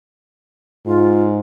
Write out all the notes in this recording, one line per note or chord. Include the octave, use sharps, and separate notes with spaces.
G#2 F4